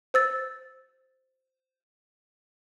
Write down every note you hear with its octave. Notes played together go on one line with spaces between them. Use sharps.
C5 E6 A6